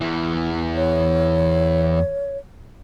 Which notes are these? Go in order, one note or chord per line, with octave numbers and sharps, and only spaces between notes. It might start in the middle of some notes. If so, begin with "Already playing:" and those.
E2 E3
C#5